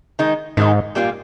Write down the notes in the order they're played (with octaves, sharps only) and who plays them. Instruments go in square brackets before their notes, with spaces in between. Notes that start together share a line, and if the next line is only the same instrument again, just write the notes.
[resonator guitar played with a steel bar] D#3 G#3 D#4
[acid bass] G#2 [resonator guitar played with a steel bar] D#3 G#3 D#4
[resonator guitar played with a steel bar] A#2 G3 A#3 F4